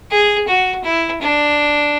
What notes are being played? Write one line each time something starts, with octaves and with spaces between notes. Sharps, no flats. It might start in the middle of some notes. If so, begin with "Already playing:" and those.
G#4
F#4
E4
D4